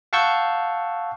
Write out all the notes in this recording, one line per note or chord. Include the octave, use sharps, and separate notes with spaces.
F5 F#5 A5 C#6 E6 G6